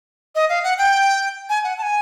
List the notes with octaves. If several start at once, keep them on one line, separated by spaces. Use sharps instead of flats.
D#5
F5
F#5
G5
G#5
F#5
A5
G#5